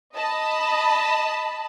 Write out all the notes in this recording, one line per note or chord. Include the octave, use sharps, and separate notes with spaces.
D#5 A5 B5